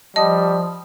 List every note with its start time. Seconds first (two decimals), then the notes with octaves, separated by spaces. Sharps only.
0.16 F3 G3 D#5 A5 D#6